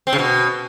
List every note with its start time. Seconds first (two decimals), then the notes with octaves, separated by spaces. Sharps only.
0.07 C4
0.13 C#3
0.19 B2